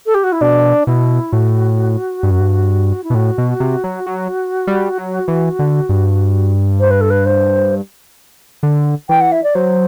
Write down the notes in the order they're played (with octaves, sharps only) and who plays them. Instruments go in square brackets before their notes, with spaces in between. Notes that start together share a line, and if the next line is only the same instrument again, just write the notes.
[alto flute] A4
G4
F#4
E4
[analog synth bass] B2 [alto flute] D4
[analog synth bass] B2 [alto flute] E4
[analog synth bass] A2 [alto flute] F#4
[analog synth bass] G2
F#2
G2
[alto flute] E4
[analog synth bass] B2
[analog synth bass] A2 [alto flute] F#4
[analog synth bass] B2
C3
F#3
F#3
G3
F#3
E3
D3
G2
[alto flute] C5
B4
A4
B4
C5
[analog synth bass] D3
[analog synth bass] E3 [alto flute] G5
[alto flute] F#5
E5
D5
[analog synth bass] F#3 [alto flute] C5